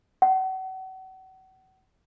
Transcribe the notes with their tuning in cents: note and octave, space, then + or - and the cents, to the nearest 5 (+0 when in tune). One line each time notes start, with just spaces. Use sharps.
F#5 +35